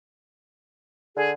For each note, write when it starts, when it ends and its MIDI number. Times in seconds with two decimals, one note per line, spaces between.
1.16 1.33 50
1.16 1.30 68